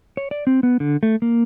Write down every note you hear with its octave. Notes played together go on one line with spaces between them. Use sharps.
C#5
D5
C4
B3
D3
A3
A#3